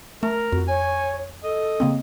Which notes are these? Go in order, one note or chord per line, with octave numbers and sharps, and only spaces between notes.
A3 A#4
F2 F#4
C#5 G#5
A4 D#5
C#3 A#3 C4